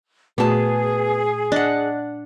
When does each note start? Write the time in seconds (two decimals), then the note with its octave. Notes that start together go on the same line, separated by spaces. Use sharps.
0.38 A#2 A3 B3 F#4 G#4 A5
1.52 D4 D#5 F#5